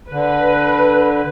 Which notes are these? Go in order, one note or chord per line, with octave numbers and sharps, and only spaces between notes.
D3 B4